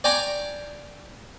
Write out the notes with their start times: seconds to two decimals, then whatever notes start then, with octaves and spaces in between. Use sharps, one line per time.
0.04 D5 G5 G#5 A#5 C#6